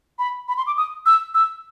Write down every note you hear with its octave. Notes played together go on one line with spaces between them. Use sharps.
B5
B5
C6
D6
D#6
E6
E6